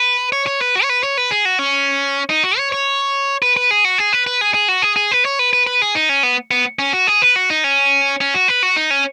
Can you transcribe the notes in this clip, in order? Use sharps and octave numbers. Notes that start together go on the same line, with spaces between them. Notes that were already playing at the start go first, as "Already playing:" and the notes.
Already playing: B4
C#5
C#5
B4
F#4
C#5
B4
C#5
B4
G#4
F#4
C#4
D#4
F#4
C#5
C#5
B4
B4
G#4
F#4
G#4
B4
B4
G#4
G#4
F#4
G#4
G#4
B4
C#5
B4
B4
B4
G#4
D#4
C#4
B3
B3
C#4
F#4
G#4
B4
F#4
D#4
C#4
C#4
F#4
B4
F#4
D#4
C#4